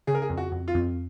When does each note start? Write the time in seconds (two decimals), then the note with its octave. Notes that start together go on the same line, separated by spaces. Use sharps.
0.07 C#3 G#4
0.15 A#4
0.22 G#4
0.30 F2
0.37 F#4
0.52 F2
0.68 F4
0.75 F2